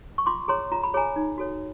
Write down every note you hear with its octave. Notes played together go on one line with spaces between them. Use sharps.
C#6
F4 C6 D6
G#4 C#5 A#5 C6
F4 A#5
B5
G#4 C#5 G#5 A#5
D#4
F#4 A4 C#5